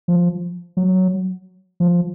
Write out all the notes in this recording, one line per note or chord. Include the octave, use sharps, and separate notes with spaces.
F3
F#3
F3